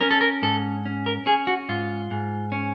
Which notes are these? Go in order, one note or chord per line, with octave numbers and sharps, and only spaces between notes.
C#4 A#4
A4
A#4
G#2 A4
C#4
A#4
C#4 G#4
F#4
G#2 F4
G#2
C#4